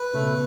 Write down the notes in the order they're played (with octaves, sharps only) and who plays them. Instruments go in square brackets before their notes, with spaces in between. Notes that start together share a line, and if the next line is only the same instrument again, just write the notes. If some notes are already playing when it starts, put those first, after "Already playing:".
Already playing: [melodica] B4
[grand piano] C#3 [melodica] A3
[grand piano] B2